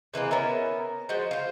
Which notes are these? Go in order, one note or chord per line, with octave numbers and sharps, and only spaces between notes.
C3 E3 G#3 A#3
B3 C#4 A#4 E5
F3 G#3 F#4 C5
F4 C5